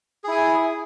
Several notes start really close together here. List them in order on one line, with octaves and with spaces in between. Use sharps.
G#4 E4 G#5